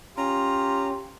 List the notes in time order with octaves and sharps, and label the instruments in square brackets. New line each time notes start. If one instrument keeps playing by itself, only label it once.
[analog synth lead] C#4 [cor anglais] F4 [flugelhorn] G4 [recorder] A#5